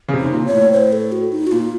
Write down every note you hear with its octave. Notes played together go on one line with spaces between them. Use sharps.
C#3
C3
D#4
C3
A#2
C#5
A2
C5
A4
F#4
D#4
F#4
A#2 F4